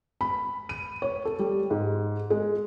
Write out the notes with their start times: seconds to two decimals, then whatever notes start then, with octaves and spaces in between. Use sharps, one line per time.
0.21 B5
0.69 D#7
1.02 C#5
1.25 A4
1.39 G3
1.70 G#2
2.30 G#3